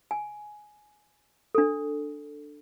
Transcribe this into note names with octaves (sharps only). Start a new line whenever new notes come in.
G#5
D4 A4